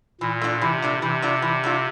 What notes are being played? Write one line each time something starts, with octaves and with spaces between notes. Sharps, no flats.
A#2 E3
A3 D4 F4
C3 E3
A3 D4 F4
C3 E3
A3 D4 F4
E3
A3 D4 F4